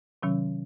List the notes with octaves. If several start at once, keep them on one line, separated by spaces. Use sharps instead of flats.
C3 D#3 F#3 C#4